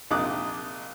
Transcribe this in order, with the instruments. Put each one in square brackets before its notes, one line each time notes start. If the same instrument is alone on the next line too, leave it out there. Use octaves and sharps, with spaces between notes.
[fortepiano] A#1 C3 D#4 D6 D#6 F#6